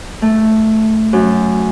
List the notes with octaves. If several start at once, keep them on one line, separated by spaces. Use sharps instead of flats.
A3
F#2